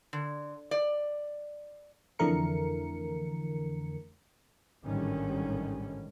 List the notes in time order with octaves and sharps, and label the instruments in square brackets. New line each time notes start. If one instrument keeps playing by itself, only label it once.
[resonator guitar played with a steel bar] D3
D5
[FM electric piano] F2 D3 E3 A3 A#4 C#7
[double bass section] A1 G#2 D3 D#3 G3 C#4